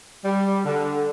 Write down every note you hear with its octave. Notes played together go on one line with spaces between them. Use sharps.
G3
D3